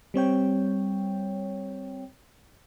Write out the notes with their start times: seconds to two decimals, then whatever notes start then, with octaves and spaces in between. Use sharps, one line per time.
0.14 G3 C4 C#5 G5